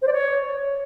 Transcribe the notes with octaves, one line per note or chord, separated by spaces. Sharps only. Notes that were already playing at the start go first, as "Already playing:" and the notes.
C5
D5
C#5